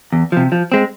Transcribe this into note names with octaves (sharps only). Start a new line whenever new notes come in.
E2
C3 F3
F3
G#3 C4